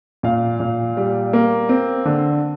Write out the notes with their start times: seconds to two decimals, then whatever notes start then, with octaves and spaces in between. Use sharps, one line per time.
0.23 A#2 F5
0.60 A#2
0.97 G3
1.33 A#3
1.69 C4
2.05 D3